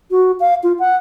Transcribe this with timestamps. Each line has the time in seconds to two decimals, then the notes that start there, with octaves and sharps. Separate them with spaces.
0.11 F#4
0.40 F5
0.63 F4
0.79 F#5